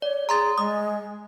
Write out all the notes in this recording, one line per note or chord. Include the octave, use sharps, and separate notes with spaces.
C#5 D5
G#4 A#5 C6 A6
G#3 D#6